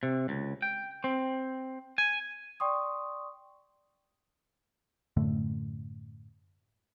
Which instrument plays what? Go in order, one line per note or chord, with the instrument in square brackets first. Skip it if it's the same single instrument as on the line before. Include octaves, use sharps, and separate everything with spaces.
[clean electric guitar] C3
C#2
G5
C4
G#5
[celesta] D5 G5 C6 C#6 D#6
[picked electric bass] F#2 A2 D3 A3